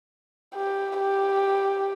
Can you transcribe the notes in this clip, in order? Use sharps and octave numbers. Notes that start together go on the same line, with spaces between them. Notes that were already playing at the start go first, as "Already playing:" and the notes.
G4
G4